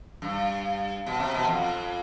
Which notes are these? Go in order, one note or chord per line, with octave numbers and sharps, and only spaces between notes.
G2
B2
C3
B2
F2